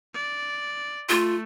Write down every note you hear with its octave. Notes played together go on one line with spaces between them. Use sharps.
D5
A3 F4